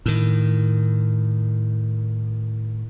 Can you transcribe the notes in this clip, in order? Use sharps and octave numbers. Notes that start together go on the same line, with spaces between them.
A2 D#3